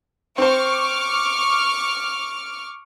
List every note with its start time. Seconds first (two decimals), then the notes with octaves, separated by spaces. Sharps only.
0.38 C4 C5 C#6 D6 F6